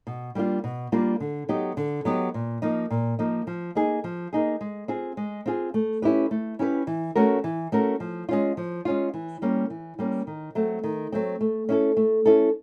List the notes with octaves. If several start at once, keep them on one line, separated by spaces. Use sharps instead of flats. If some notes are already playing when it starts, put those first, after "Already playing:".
B2
G3 A#3 D4 F4
B2
G3 A#3 D4 F4
D3
F#3 B3 D#4 G4
D3
F#3 B3 D#4 G4
A#2
F3 A#3 D#4
A#2
F3 A#3 D#4
F3
A#3 D#4 G#4
F3
A#3 D#4 G#4
G#3
C4 F4 G#4
G#3
C4 F4 G#4
A3
C#4 E4 G4 B4
A3
C#4 E4 G4 B4
E3
A3 C#4 F#4 A#4
E3
A3 C#4 F#4 A#4
F3
G#3 C#4 F4
F3
G#3 C#4 F4
E3
G3 A#3 C#4
E3
G3 A#3 C#4
D#3
F#3 A3 C4
D#3
F#3 A3 C4
A3
C#4 E4 A4
A3
C#4 E4 A4